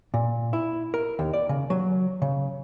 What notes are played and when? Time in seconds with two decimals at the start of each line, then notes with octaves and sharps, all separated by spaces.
0.14 A#2
0.53 E4
0.94 A#4
1.19 D#2
1.33 D5
1.49 C#3
1.70 F#3
2.22 C#3